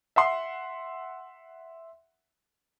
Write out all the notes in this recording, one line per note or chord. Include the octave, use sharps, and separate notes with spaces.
E5 F#5 C6